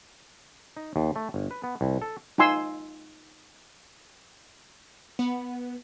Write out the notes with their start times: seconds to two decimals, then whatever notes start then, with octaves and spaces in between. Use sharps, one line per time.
0.77 D#4
0.96 D#2
1.16 A3
1.34 G1
1.51 B4
1.64 B3
1.81 C2
2.02 A4
2.38 D#4 F4 G#5 C6 E6
5.19 B3